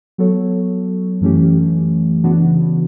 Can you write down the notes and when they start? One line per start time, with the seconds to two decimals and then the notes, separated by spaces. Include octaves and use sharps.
0.18 F#3 B3 F#4 A4 C#5
1.21 F#2 E3 A3 C#4 G4
2.23 C#3 E3 B3 D4 F#4